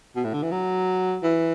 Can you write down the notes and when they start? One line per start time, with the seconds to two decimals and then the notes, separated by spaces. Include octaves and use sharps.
0.16 B2
0.25 A2
0.34 D3
0.43 E3
0.52 F#3
1.23 E3